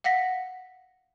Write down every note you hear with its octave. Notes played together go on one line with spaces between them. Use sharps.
F5 F#5 A#6 B6